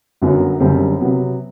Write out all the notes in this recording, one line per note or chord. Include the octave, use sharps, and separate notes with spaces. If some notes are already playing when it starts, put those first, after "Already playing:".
G1 F#2 F#3 B3 F#4
F#1 F#2 D3 G3 C4
C3 F#3 B3